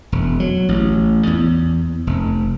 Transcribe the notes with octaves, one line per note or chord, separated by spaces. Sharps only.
E1
F#3
A1
E2
F1